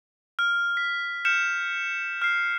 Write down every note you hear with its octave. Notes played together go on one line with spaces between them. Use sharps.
F6
B6
F6 G6 C#7 E7
F6 C7